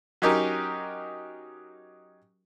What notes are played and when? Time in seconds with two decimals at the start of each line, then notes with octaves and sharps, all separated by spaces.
0.22 F#3 C#4 D#4 G4 A#4